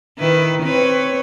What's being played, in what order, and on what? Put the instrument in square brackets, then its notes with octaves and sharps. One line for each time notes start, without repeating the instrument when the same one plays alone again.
[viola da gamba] D#3 E4 B4
C4 B4 C#5